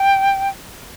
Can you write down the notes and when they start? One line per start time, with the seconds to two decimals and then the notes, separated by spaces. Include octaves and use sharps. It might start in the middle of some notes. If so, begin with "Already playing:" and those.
Already playing: G5